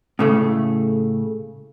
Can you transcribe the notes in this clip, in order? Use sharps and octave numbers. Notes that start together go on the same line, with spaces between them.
A2 C#3 A3